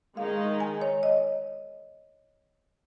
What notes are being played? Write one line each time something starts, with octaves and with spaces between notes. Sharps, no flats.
D#3 G#3 D#4 F5
G#5
C#5
D#5